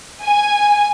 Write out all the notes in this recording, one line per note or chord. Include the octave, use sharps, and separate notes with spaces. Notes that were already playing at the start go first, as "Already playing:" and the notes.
G#5